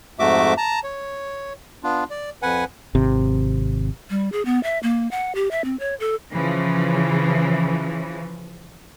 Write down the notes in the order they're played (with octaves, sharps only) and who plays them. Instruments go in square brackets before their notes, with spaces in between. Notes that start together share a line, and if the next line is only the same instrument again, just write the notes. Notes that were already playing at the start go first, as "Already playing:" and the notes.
[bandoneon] F2 G#2 A3 F#4 E5 D6
A5 A#5
C#5
B3 D4 F4
D5
F2 B4 F#5 G#5
[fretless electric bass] G#1 C3
[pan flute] G3
G#4
B3
E5
A#3
F#5
G4
E5
C4
C#5
A4
[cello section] C#3 E3 F3